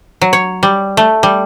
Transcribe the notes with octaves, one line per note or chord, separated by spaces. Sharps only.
F#3
C#5
G3
A3
G3